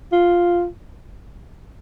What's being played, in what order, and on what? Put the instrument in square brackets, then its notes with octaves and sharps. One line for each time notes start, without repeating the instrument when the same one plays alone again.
[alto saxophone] F4